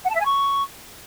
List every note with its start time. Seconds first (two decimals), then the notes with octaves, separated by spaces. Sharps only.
0.05 F#5
0.10 A5
0.15 E5
0.20 G#5
0.25 C#6